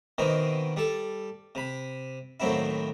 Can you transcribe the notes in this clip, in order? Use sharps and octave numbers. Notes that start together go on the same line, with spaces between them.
B2 D#3 E3 C4
G3 A4
C3 B5
D#2 A2 F#3 C4 E4